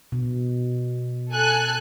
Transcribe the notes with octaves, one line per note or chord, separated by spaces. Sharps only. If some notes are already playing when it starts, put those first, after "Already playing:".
B2
A4 G#5 F#6